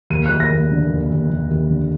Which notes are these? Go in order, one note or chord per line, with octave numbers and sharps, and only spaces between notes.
D#2 D#7
D#2 F#6
A#6
D#2
D3
D#2
D#2
D#2
D#2
D3